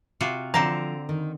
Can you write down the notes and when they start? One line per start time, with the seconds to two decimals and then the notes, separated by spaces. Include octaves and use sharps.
0.21 C3 F4 F#4
0.54 D3 F3 C4 A5 A#5
1.09 D#3